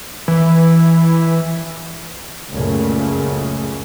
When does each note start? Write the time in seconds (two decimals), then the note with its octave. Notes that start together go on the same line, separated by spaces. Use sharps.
0.28 E3
2.53 C#2 F#2 A#2 C#3 A3